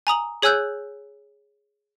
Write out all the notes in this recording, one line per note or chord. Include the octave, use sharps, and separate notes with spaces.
G#5 A#5 D#6 F#7
G#4 C#5 G#5 E6 F#6 G6